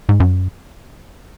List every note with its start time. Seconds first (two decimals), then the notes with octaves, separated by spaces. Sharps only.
0.09 G#2
0.20 F#2